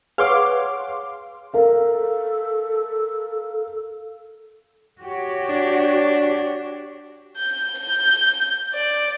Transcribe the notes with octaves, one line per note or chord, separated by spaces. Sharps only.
G#4 B4 C#5 F5 F#5 C6 D6
A4 A#4 F5
F#4 G4 C#5
D4
G6
G6
D5